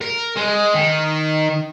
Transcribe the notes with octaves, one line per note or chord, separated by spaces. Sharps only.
A#4
G#3
D#3